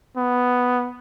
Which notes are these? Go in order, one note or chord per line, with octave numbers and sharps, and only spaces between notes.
B3